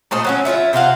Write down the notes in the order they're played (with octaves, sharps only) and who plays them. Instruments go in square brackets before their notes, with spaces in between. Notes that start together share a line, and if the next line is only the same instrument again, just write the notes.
[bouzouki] A#2 A3 C5 D#5
F#3 B3 C#4
E4 F4 C#5 E5
C3 C5 F5 F#5